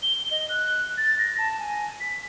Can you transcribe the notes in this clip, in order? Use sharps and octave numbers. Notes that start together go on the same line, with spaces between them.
G7
D#5
F#6
A6
A#6
A5
G#5
B6